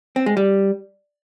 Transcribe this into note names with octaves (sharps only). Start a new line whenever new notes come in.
C4
G#3
G3